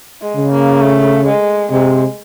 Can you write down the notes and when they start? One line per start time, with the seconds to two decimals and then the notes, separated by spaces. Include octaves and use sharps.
0.21 G#3
0.36 C#3
0.52 A#3
0.81 A3
1.27 G#3
1.71 C3 G#3